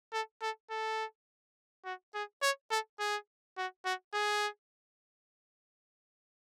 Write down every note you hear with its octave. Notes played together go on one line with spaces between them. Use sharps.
A4
A4
A4
F#4
G#4
C#5
A4
G#4
F#4
F#4
G#4